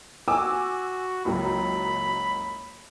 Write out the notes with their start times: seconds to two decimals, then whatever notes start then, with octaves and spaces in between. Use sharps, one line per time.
0.28 F#4 G#5 D6 E6
1.25 F#1 C#2 F#2 B5